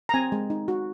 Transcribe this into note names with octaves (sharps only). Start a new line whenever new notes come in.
A#5
C4 G#5
G#3
D#4
F#4